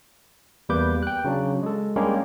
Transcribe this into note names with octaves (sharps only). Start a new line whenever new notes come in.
E2 G3 A#3 B4 D6 G6
G5 F#6
C#3 F#3 D4
G#3 A4
G3 G#3 A#3 C#4 D4 G4